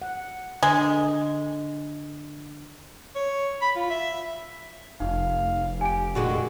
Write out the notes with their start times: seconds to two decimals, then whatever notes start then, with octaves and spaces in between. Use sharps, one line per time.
0.02 F#5
0.63 D3 G#3
3.15 C#5
3.62 B5
3.76 F4
3.90 E5
5.00 F1 D#4 F5
5.81 G4 G#5 D7
6.15 A#2 D3 G#3 F#4